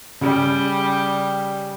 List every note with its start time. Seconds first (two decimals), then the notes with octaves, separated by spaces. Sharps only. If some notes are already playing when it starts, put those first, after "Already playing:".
0.21 C#3 G3